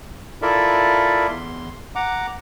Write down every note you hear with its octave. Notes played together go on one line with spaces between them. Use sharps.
E4 F4 A4 A#4 D5 E5
E2 C6
F#5 A#5 D6